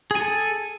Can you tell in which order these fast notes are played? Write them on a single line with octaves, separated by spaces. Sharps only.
G#4 G#5 A4